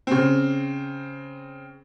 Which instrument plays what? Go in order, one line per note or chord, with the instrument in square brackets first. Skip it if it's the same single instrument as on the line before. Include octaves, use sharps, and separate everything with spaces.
[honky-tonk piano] C#3 C4